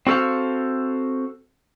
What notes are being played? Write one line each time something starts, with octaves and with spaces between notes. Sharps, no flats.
C4 F#4 A4 C5 F5